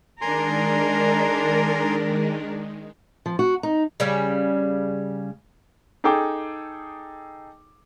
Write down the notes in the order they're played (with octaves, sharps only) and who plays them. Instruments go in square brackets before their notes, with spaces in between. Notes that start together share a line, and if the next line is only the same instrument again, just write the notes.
[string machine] D#3 G#3 [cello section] D4 A#4 [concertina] G#5 A#5 C6
[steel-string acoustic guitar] F3
F#4
D#4
[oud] C#3 G3 C#4
[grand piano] D#4 G#4 A4 G5 D6